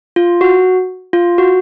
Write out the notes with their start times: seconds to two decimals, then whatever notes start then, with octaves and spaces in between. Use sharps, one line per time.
0.16 F4
0.41 F#4
1.13 F4
1.38 F#4